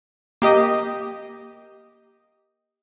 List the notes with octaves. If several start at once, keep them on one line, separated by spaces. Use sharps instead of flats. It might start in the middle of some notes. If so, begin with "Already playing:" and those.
A#3 G4 D#5